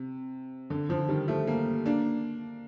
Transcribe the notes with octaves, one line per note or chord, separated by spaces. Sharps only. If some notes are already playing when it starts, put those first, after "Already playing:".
Already playing: C3
D3
D3 F3
D#3 G3
F3 A3
G3 A#3
A#3 D4